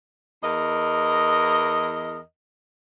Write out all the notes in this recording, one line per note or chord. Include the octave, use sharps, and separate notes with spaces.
E2 A#4 D#5